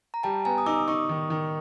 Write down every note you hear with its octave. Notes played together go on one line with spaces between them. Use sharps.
A#5
G3 G5 A5
B3 G#5 A#5
D#6
D#4 D6 E6
D#4 C#6 D#6
D#3
D#3